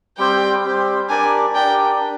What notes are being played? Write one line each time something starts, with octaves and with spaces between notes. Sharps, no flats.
G3 C4 G4 C5 G5
G3 C4 G4 C5
D4 G4 A#4 D5 G#5
D4 G4 A#4 D5 G5
D4